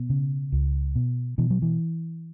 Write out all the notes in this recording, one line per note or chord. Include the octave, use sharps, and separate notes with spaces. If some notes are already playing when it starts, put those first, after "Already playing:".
Already playing: B2 B3
C#3
C#2
B2
B2 E3
F#3
E3